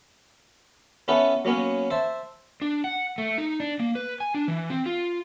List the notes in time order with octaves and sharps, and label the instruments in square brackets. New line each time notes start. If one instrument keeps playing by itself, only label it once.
[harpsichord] B3 C#4 E4 A4 B4
F#3 A#3 B3 C#4
C5 E5 A5
[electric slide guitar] D4
F#5
A3
D#4
D4
A#3
B4
G#5
D4
E3
C4
F4